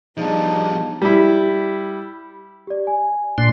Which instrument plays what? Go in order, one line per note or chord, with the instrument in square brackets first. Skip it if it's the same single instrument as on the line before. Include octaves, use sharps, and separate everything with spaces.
[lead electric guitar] F3 G3 [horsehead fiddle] B3 D4 [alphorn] D#4 [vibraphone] G#4 F5 A5
[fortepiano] G3 E4
[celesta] G4 D5
G#5
[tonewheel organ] A#2 D4 C6